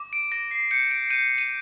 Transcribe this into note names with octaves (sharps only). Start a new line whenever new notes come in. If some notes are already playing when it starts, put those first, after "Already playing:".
Already playing: D6
D7
D6 A#6
C7
G6 C#7
D7
G6 D#7
D#7